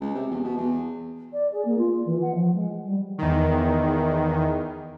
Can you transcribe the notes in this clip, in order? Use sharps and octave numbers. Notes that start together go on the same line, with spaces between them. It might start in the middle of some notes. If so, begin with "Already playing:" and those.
C#2
C3
E2
B2
E2
D5
G#4
A#3
F4
E3
F#5
F3
G#3
G3
E2 D#3